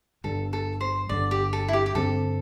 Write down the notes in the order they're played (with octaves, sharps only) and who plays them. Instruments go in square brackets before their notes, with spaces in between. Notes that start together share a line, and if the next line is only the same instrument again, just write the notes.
[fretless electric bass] G1 G2 D3 [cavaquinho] A4
[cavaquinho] A4
C5
[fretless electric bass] G1 G2 D3 [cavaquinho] D5
[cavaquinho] G4
A4
E4
G4
G4
[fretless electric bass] G2 D3 C4 [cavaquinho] A4